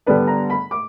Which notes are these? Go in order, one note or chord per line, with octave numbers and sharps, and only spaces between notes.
D3 G3 B3 D4 B4
A#5
B5
D6